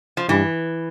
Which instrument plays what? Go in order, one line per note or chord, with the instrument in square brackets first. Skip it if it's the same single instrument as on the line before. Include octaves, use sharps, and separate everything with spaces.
[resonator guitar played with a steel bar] F3
[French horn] G2 [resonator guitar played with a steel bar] E3